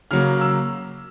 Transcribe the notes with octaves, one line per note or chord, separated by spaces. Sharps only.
C#3 F#3 A#3 F6
E6